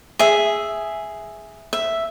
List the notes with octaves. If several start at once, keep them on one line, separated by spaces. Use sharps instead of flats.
G#4 E5
E5